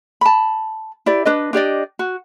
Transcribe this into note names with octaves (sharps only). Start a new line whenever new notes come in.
A5 B5
E4 G4 D5
D4 B4 D#5
D4 G4 D5 D#5
F#4